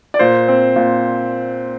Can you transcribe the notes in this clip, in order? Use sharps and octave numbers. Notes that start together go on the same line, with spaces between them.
D5
A#2 C5
C4
A#2